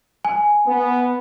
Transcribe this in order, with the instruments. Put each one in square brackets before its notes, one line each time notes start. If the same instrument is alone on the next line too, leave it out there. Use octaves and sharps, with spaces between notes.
[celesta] G#5
[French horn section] B3